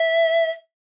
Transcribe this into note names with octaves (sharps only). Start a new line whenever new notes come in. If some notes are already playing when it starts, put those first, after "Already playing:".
Already playing: E5